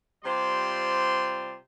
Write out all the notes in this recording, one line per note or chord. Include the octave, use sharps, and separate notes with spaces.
C3 G3 F4 C5 D5 C6